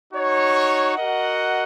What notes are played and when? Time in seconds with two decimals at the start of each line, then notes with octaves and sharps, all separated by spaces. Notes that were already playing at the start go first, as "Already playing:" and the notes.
0.13 D#4 F#4 C#5
0.96 F#4 A#4 D#5 F#5